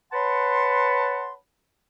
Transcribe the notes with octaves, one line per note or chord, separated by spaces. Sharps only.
B4 C#5 F#5 A5 B5 C6